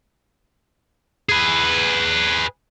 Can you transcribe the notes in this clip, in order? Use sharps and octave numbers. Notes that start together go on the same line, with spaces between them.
G#4 B4